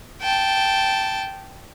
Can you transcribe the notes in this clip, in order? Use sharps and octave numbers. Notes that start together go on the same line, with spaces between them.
G5 A5